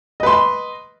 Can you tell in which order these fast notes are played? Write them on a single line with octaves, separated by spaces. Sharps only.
D#5 B4 C6